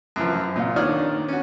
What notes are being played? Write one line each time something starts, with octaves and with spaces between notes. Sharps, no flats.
F#2 E3 F3
A#2 F4
D#3 D4 C#5 D5 D#6 F6
C#4 F#4